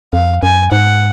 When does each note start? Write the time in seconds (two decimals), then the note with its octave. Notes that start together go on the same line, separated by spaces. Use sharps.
0.13 F2 F5
0.43 F#2 G#5
0.72 G#2 F#5